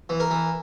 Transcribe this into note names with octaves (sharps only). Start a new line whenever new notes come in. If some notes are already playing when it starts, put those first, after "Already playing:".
E3
A#4
E3